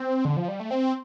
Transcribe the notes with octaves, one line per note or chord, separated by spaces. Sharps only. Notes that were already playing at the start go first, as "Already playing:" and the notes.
Already playing: C4
D3
F3
G3
A3
C4